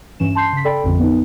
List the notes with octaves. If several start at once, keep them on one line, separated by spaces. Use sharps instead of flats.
G2 E3 C#4 E7
A5 C6 G6 C7
C#3 B6
A4 D5 G5 B5
A1 F2 D3 F3
B3 D#4